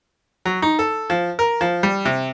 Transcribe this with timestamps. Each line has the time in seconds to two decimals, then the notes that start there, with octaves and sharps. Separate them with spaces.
0.46 F#3
0.62 D#4
0.79 A4
1.10 F3
1.39 A#4
1.61 F3
1.83 G3
2.05 C3